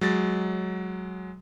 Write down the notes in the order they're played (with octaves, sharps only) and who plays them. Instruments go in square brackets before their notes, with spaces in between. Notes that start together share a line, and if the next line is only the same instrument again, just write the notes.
[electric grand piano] F#3 G#3 A6